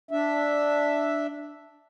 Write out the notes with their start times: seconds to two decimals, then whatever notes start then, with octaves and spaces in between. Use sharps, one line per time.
0.11 D4 E5